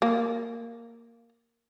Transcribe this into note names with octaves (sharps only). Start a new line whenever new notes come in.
A#3